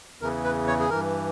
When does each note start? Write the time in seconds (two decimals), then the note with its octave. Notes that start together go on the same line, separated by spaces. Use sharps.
0.21 E2 C#3 E3 A#4
0.44 B4
0.67 C#5
0.80 G#4
0.90 G2 E3 A#4